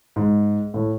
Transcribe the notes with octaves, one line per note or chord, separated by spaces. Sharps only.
G#2
A2